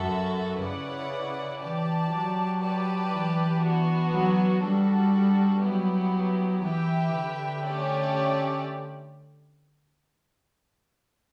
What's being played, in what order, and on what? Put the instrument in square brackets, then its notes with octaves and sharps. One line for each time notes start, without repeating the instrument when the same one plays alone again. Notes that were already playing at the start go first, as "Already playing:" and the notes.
Already playing: [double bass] F#2 [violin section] F#4 A4 E5
[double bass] C#3 [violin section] C#4 E4 B4 D5 F#5
[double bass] E3 [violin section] G4 D5 A5
[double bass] F#3
[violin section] G4 B4 D5 A5
[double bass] E3
[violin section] B3 D4 F#4
[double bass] F#3
[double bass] G3 [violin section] D4 F#4 A4
[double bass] F#3 [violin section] B3 E4 G4
[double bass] E3 [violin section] G4 B4 E5 G5
[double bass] D3
[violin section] A3 C#4 G4 D5